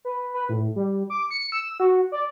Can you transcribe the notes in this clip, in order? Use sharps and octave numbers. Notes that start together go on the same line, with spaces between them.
B4
B4
A2
G3
D6
C#7
E6
F#4
D5